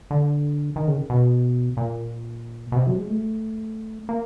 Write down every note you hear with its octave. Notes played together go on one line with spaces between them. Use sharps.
D3
D#3
C#3
B2
A#2
B2
C3
F#3
G#3
A3
A#3